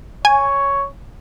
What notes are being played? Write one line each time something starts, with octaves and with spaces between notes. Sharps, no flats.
C#5 G#5